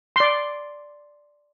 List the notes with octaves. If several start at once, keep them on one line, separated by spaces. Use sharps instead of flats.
D5 C6